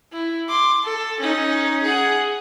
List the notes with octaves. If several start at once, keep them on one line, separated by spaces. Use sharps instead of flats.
E4
C6 D6
A4
C#4 D#4
G#4 F#5